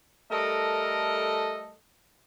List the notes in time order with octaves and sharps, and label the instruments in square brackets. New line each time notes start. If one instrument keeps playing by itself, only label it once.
[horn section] G3 A3 A4 A#4 D#5